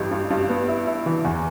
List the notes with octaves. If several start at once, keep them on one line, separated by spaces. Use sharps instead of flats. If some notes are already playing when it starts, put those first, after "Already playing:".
Already playing: A1 G2 E4
G2
G2
B3
E4
E4
E3
E2